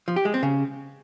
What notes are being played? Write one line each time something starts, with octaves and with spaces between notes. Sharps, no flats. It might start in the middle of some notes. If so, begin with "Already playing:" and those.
F3
G4
G#3
C4
C#3